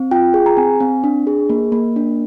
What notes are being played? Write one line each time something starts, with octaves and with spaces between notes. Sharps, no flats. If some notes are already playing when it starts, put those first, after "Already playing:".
Already playing: C4
F4 G5
G#4
A#5
C4 G#5
C4
D4
G#4
A#3
A#3
D4